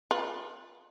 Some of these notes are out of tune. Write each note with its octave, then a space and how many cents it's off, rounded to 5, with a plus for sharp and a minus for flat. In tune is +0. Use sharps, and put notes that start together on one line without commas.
F4 +15 B4 -20